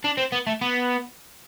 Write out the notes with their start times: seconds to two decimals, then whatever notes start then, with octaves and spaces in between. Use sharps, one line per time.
0.04 D4
0.18 C4
0.32 B3
0.47 A3
0.61 B3